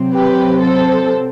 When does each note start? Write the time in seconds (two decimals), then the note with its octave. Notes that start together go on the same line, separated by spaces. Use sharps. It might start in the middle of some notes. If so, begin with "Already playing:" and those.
Already playing: C3 F#3 C4
0.13 G4 B4
0.60 A4 C5